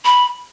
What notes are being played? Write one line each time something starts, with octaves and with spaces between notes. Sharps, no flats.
B5